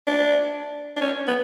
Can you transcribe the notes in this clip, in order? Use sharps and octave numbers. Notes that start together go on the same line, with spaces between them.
D4
D4
C#4
B3